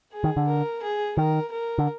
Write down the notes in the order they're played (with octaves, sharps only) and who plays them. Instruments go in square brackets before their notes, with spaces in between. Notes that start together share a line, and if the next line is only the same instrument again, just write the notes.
[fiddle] G#4
[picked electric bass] D#3
D3
[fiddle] A#4
G#4
[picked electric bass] D#3 [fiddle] A#4
[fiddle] A#4
[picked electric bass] D3